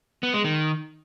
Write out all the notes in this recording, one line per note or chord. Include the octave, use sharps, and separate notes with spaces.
B3
G#3
D#3